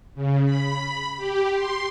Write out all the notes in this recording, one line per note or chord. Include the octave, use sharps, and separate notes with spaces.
C#3
B5
G4
C6